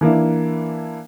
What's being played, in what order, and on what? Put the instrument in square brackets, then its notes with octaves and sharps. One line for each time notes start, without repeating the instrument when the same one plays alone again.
[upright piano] E3 A#3 D4 E4